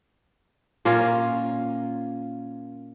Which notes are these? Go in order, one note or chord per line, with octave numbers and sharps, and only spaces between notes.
A#2 A#3 C#4 F4